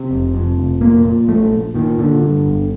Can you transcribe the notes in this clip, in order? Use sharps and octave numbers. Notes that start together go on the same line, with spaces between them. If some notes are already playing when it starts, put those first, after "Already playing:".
Already playing: C3
F1
F2
F1
A#2 A#3
A#2
A#1 A3
A#1
A#2 D#3
A#2 D3
G2
G1